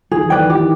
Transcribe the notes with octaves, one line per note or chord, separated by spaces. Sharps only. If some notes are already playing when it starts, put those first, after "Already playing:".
D#3 G#4
E3
D#3 B4 D5 G5
E3 G4
D#3